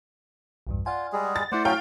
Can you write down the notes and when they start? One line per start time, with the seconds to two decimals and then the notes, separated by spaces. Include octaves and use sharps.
0.67 B1 E2 G2
0.86 F4 D5 F#5 G#5
1.13 G3 G#3 G#4
1.36 A6
1.52 A3 E4 C5 D5 F#5
1.65 F#3 C#4 F5 G5 F6